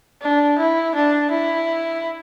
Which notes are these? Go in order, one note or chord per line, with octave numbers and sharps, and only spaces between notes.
D4
E4
D4
E4